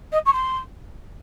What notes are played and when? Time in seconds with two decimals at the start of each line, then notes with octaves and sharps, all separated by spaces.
0.12 D#5
0.25 C#6
0.32 C6